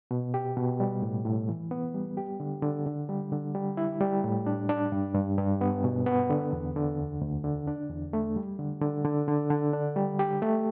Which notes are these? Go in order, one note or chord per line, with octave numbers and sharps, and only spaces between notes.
B2
G4
B2
G3
A2
A2
E3
B3
G3
G4
D3
D3
D3
G3
D3
G3
E4
G3
A2
D4
D4
G2
G2
G2
B3
B2
B3
D3
E2
D3
D2
D2
D3
D4
E2
A3
G3
D3
D3
D3
D3
D3
D4
G3
G4
A3